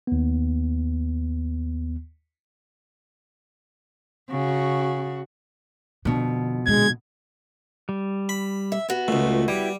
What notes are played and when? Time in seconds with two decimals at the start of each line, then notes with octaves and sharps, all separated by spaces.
0.07 D#2 B3
4.30 C#3 F#4
6.05 F2 B2 D3
6.66 A#2 D3 G#3 G#6
7.89 G3
8.29 B5
8.72 E5
8.88 B3 F#4
9.08 C#2 A#2 A3
9.48 G3 E4 G4